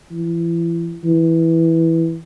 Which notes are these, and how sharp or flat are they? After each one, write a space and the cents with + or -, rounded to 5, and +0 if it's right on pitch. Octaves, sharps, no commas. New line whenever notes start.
E3 +30
E3 -5